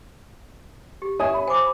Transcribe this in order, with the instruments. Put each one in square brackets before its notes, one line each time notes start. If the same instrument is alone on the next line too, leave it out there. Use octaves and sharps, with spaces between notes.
[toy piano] G4
[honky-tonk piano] C#5 G#5 D#6 [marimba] D#5 E5 G#6
[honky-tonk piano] B5
[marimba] C5 [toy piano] G#5 D6